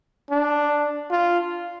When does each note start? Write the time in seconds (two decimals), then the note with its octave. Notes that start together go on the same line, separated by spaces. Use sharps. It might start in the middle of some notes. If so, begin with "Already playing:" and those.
0.30 D4
1.11 F4